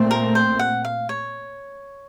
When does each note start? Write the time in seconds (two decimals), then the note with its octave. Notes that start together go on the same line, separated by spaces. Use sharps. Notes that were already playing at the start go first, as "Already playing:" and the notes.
Already playing: A#2 A3 C4
0.11 A#4
0.35 C5
0.59 F#5
0.85 F5
1.09 C#5